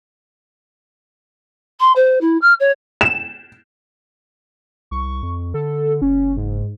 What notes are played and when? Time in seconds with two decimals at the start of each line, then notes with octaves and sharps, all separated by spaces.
1.80 C6
1.95 C5
2.21 E4
2.41 F6
2.59 C#5
3.01 E7
4.91 C2 C#6
5.23 F2
5.54 D3 A4
6.02 F#1 C#4
6.37 G#2